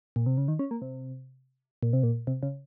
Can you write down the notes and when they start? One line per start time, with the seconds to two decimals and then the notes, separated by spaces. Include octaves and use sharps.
0.16 A#2
0.26 C3
0.37 C#3
0.48 D#3
0.59 C#4
0.71 A#3
0.82 C3
1.83 A#2
1.93 C3
2.03 A#2
2.27 C3
2.43 C#3